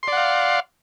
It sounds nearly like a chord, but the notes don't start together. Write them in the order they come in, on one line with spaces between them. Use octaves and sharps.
C6 D5 F#5 F5